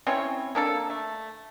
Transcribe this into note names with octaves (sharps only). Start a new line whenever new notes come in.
C4 C#4 E4 C#5
A#3 D4 A4
A3